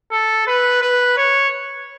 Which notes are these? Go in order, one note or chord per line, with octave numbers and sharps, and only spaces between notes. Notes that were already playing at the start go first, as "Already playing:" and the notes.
A4
B4
B4
C#5